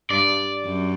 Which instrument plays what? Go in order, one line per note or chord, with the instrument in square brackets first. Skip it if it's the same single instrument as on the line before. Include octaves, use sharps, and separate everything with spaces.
[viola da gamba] G2 [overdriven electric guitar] D5
[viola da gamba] F#2